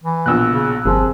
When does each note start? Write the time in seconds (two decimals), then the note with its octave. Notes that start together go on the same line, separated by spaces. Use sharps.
0.03 E3
0.26 A#1 B2 E6 F#6
0.49 C#3
0.85 G1 C3 F3 G#4